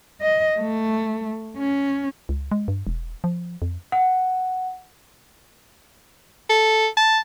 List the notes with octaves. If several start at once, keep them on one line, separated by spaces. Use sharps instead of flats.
D#5
A3
C#4
C#2
G#3
G2
E1
F3
F2
F#5
A4
A5